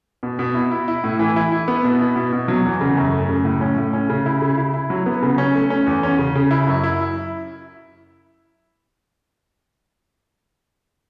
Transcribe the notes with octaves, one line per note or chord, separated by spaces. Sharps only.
B2
B2
E4
E4
E4
A2
E3
E4
E4
B3
B2
E4
B2
B2
F#3
E2
C#3
F#2
A3
C#3
A2
C#4
A2
C#4
C#3
E4
C#3
E4
E4
F#3
B3
C#3
C#4
A3
C#4
E2
C#4
C#3
C#3
E4
F#2
E4